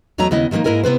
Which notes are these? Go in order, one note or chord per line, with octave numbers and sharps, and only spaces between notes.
E2 F#3 A3 C#5 D#5 A#5
D#2 C#3 B3 E4 D#5
D#3 F3 G#3 A#3 D#4
G#2 A#3 E4 A#4 D#5 G#5
C3 B3 B4 C5